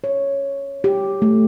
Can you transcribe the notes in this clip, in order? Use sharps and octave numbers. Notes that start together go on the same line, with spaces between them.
C#5
G4
A3